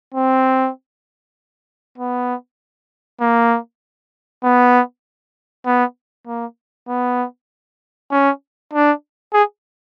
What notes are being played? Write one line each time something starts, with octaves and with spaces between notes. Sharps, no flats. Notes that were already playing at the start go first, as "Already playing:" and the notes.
C4
B3
A#3
B3
B3
A#3
B3
C#4
D4
G#4